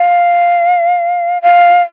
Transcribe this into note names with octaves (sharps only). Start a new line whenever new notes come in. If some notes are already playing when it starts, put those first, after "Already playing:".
Already playing: F5
F5